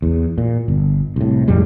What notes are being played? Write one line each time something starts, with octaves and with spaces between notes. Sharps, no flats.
E2
A#2
G1
C2 A2
F2 A2 G3 G#3